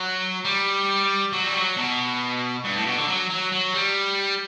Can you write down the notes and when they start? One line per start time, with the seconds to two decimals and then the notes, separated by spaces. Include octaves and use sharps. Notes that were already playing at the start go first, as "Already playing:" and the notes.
Already playing: F#3
0.45 G3
1.33 F#3
1.44 G3
1.55 F#3
1.77 B2
2.65 G2
2.76 A2
2.86 B2
2.98 D3
3.08 F#3
3.30 F#3
3.52 F#3
3.74 G3